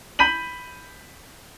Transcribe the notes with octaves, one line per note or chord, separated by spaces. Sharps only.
B5 G6 B6 D#7 F#7